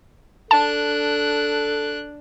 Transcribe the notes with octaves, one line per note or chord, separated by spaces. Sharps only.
D4 A4 A5 F#6